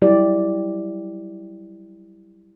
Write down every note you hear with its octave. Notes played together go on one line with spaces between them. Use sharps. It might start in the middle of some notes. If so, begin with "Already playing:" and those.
F#3 G3 E4 G4 D5